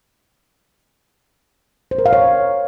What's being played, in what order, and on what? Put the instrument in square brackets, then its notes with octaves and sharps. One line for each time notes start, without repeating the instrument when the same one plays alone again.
[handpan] C5
A#4
F5
C#5